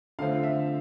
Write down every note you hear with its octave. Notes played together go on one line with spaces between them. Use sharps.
D3 F3 A3 C4 F5
E5